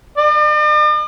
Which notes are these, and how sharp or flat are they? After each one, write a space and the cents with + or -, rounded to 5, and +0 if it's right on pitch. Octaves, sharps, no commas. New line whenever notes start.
D5 +45